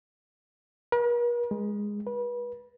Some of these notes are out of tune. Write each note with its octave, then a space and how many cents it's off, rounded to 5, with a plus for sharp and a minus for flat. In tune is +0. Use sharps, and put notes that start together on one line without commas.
A#4 +45
G#3 -10
B4 -30